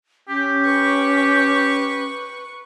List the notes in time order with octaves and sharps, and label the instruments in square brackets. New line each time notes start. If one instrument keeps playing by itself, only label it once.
[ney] C#4 [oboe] G4
[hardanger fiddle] B4 C#6